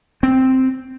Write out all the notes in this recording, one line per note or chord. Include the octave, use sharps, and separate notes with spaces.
C4